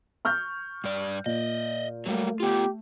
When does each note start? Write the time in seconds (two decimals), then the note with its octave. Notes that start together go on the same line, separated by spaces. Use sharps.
0.25 C#6 F6 G6
0.84 G2 D5
1.26 A#2 D#5 E5
2.06 F#3 G3 A3 A#3
2.40 B3 F4 G4